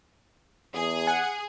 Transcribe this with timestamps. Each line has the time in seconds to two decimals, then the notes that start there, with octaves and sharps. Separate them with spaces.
0.75 E2 G#4
1.07 F#5 G#5